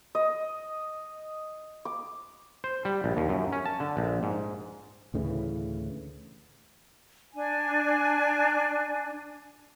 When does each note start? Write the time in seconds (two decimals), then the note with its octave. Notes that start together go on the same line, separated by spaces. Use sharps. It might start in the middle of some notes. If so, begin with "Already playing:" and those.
0.15 D#5
1.85 D6
2.64 C5
2.85 G3
3.04 A#1
3.17 D#2
3.29 F#2
3.52 C#4
3.66 A5
3.80 D3
3.97 A#1
4.23 G#2
5.14 D2 A2 C#3 E3
7.33 D4 G#5